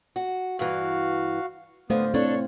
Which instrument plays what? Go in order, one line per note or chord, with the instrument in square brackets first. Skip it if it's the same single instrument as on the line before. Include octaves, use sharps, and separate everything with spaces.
[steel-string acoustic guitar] F#4
[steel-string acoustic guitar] G2 E3 [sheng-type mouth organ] F#4 F5
[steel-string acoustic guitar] D3 [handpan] A3 C5 F5 [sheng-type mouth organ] B3 D#6
[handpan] C4 E4 [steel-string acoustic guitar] D4 A4 [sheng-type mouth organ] C#5